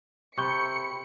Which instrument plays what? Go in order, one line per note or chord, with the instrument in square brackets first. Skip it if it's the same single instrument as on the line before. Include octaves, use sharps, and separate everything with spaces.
[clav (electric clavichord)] C3 [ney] B5 [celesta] C#6 G6 G7 [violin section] C#7